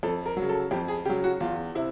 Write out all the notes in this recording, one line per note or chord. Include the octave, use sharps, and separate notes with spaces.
F2 A4
A#4
F#3
C#3
A4
F2 G4
G#4
C#3 F#3 G4
F#4
E2 F4
C3 E4